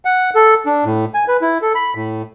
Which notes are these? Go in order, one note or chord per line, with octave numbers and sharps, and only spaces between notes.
F#5
A4
D4
A2
G#5
B4
E4
A4
B5
A2